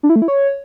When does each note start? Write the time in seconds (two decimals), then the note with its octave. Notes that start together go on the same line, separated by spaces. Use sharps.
0.03 D4
0.10 E4
0.16 A3
0.22 E4
0.28 C#5